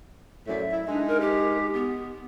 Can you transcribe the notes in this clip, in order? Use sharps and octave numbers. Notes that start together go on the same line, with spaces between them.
F#2 A2 D5 E5
E4
G#3 D4 D#4
A#4
G4
B3